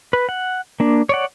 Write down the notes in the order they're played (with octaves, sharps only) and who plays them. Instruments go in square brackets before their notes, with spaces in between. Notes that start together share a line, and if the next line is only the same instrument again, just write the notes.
[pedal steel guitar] B4
F#5
A#3 D4
C#5 D5 F#5